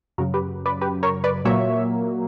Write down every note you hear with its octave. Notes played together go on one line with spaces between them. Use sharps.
F#2 C#3 F#3 F#4 A#4
G4 B4
B4 D5
G4 B4
A#4 C#5
B4 D5
A#2 F#3 A#3 C#5 E5